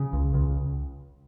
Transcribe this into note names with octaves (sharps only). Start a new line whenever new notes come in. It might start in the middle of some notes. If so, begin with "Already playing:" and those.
Already playing: C#3
C#2
C#2